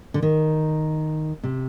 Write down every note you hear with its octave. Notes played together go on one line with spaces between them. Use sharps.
D3
D#3
C3